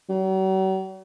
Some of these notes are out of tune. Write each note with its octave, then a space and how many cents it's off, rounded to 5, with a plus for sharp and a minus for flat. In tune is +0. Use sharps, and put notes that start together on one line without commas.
F#3 +45